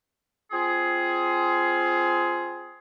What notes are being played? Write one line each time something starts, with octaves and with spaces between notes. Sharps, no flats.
C4 F4 G#4